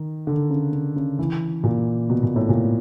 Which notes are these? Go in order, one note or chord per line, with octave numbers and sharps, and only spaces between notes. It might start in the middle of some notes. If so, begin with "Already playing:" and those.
Already playing: D#3
D3
C#3
C#3
C#3
E3
A#2
B2
A#2
A2
A#2